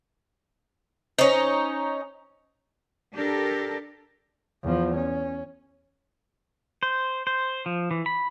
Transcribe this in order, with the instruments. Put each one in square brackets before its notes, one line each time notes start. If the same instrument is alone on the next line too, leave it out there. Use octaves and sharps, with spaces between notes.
[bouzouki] C#4 D#4 [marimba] C5 C#5
[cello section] D4 G4 A4 A#4
[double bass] E2 F3
C#4
[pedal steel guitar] C5
C5
F3
E3
B5